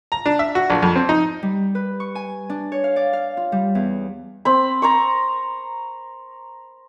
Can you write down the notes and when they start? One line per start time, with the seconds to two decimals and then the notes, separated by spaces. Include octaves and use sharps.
0.12 A#5
0.26 D4
0.39 E5
0.55 F#4
0.70 A#1
0.82 F2
0.96 C4
1.09 D#4
1.42 G3
1.75 B4
2.00 C#6
2.15 G#5
2.50 D4
2.72 C#5
2.84 F5
2.96 D5
3.13 F5
3.37 F4
3.52 G3
3.75 E2
4.45 C4 B5
4.82 A#5 C6 C#6